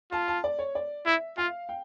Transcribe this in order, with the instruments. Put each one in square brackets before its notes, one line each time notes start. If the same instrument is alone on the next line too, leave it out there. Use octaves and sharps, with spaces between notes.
[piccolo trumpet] F4 [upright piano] A5
[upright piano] A5
D5
C#5
D5
[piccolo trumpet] E4 [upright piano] E5
[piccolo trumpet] F4 [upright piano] F5
[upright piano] G5